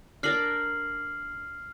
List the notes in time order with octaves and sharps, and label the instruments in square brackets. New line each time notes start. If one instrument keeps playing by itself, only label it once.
[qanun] D4 A#4 D5 [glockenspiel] F6 C7 F#7